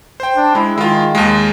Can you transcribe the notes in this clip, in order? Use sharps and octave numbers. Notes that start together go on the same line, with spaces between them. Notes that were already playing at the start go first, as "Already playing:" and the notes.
C5 G5
D4
G#3 E4
D#3 G#3 F4
D#2 G#3